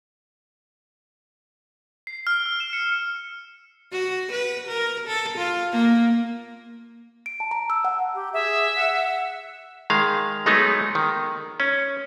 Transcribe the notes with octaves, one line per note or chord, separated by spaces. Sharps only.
C7
F6
E6
E7
C#7
F#4
B4
A#4
A4
F4
A#3
D7
A5
A#5
E6
F#5
G4
G#4 E5
F#5
D#3 G#3 F5
F#3 G#3 A3 B3 D#4
D#3
C#4